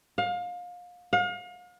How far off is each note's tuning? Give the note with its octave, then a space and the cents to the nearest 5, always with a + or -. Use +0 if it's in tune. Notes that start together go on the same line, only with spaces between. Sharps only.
F5 +30
F5 +40